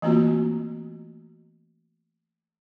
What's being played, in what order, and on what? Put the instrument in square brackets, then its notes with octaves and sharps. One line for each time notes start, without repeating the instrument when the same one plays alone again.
[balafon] E3 A3 A#3 C4 F4 F#4